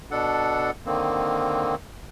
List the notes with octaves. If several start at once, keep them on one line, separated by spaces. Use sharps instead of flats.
B2 D4 A4 F#5
D3 D#3 A#3 C4